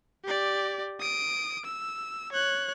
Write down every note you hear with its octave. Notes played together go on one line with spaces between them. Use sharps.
G4 D5
D#6 D7
E6
C#5 F#6